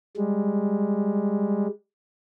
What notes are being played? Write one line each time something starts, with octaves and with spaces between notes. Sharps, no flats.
G3 G#3